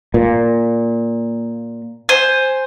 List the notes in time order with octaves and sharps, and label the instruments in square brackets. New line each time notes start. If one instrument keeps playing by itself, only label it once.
[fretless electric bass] A#2
[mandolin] C5 G#5